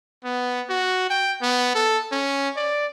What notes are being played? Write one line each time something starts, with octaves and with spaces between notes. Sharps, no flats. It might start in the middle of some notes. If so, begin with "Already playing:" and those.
B3
F#4
G5
B3
A4
C#4
D5